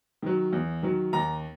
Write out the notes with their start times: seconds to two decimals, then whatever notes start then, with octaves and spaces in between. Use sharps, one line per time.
0.22 D#3 F#3
0.53 E2
0.83 D#3 F#3
1.13 D#2 A#5